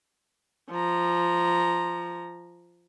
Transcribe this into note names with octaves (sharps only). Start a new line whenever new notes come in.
F3 A#5